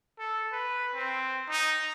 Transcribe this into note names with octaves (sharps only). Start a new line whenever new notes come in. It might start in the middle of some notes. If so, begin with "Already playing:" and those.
A4
B4
C4
D#4